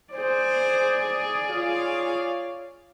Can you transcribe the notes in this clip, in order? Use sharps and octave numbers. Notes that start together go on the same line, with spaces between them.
G#4 C5 D5
F4 C#5 F5